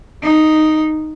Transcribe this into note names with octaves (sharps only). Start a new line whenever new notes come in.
D#4